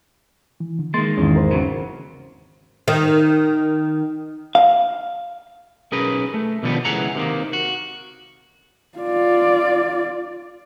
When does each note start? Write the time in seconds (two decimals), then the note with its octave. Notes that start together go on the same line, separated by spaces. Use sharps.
0.60 E3
0.79 D3
0.94 D#3 G#3 A#3 C6 A6
1.18 G#1 E2 C#4
1.36 A#4 C5
1.51 C#3 F#3 B3
2.88 D#3
4.55 F5
5.92 B1 C#4 G#4 A#4 B4
6.34 A3
6.63 B2 D3 D#3 F3 G3 B3
6.85 C#2 E3 G#4 F#5 A#5
7.15 C3 D#3 A#3
7.53 F#4
8.98 F4 D5